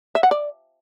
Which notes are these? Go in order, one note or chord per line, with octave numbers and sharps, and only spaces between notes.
E5
F#5
D5